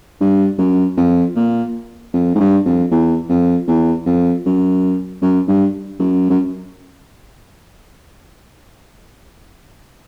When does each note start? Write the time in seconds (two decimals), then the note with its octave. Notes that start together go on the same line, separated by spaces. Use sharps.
0.21 G2
0.58 F#2
0.97 F2
1.36 A#2
2.14 F2
2.35 G#2
2.40 G2
2.66 F2
2.91 E2
3.29 F2
3.67 E2
4.06 F2
4.46 F#2
5.22 F#2
5.48 G2
5.99 F#2
6.30 F#2